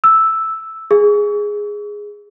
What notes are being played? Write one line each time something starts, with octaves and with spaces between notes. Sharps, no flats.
E6
G#4